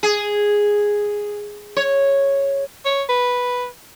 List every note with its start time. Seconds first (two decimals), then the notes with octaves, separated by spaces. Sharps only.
0.03 G#4
1.77 C#5
2.85 C#5
3.09 B4